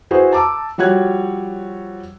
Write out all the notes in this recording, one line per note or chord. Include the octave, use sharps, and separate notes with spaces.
E4 F#4 G#4 B4 C5
A5 A#5 D6 E6
F3 G3 F#4 C#5 F#6 G#6